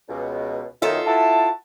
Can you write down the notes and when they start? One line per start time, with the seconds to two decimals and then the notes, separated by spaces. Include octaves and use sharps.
0.09 C#2 B2
0.82 F#2 B2 D#3 F4 A4 E5
1.07 E4 F#4 A5